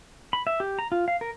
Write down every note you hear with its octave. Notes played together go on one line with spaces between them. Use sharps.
B5
E5
G4
A#5
F4
F5
A#4